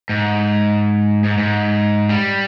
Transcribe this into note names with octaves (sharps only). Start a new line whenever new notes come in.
G#2
G#2
G#2
G3